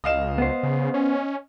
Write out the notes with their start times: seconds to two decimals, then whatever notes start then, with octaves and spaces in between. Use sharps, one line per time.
0.04 C#2 D#5 F5 E7
0.38 B3 C5
0.63 C#3
0.94 C#4